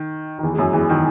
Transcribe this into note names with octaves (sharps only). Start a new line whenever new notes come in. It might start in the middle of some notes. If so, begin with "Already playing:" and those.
Already playing: D#3
D#3
E2 E3
G#3
F#2 F#3
E2 E3
D#3